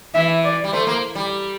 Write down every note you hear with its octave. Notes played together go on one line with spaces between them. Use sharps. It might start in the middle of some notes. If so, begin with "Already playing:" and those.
E3 E5
D5
G3
A3 C5
A#3
G3